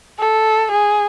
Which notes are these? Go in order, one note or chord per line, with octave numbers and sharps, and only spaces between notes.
A4
G#4